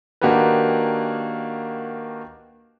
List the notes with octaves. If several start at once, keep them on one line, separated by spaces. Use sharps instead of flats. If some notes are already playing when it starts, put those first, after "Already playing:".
D#3 A#3 D4 F#4 G4 B4